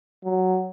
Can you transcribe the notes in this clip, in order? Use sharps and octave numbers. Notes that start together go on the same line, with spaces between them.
F#3